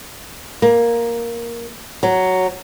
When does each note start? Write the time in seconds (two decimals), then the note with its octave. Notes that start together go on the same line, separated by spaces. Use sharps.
0.62 A#3
2.03 F#3